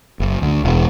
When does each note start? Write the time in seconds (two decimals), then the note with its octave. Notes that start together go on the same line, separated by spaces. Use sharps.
0.20 F#1
0.42 D2
0.65 E1